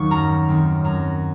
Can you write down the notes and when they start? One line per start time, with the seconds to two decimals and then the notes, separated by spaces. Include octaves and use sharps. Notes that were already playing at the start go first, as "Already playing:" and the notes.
Already playing: D#2 D#3 F#3 A#3 C#6
0.11 F#2 A#5
0.48 D#3 A3 C4
0.84 F#2 A#5